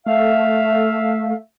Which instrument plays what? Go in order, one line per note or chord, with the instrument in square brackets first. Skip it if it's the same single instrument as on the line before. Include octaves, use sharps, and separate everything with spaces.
[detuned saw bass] A3 [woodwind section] E5 F5